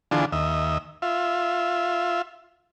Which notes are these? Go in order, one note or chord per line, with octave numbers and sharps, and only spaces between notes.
D3 E3 D4 F4 G#4
D#2 D#5 E5
F4 E5